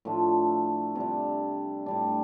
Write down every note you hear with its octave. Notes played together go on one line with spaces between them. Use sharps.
A2 F3 A3 D4
C3 G3 D4
A2 G3 D4